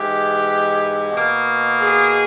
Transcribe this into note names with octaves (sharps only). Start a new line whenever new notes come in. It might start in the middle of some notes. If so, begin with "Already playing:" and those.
Already playing: G#2 E3 G#3 G4
B2 A#3
G#4